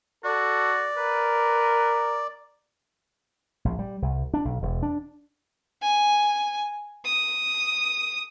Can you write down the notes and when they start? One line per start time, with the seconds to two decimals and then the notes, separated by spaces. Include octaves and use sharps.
0.25 F#4 A4 D5
0.97 A#4 B4
3.65 A#1
3.79 G3
4.02 C2
4.34 D4
4.45 B1
4.62 E1
4.83 D4
5.83 G#5
7.06 D#6